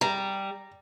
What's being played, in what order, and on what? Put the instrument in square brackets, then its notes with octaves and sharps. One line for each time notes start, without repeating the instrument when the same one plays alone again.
[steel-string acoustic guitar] G3 [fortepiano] A#5